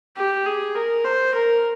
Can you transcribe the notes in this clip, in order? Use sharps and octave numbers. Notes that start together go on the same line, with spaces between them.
G4
G#4
A#4
C5
A#4